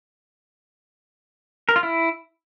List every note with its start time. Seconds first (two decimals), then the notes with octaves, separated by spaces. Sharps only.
1.69 A#4
1.76 F4
1.83 E4